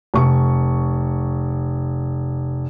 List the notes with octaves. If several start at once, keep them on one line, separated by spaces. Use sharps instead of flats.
F1 C#6